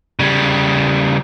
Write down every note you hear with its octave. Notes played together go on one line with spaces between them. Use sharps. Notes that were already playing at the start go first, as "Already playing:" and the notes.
C#3 G3